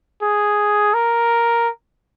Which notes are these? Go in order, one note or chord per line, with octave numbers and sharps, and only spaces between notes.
G#4
A#4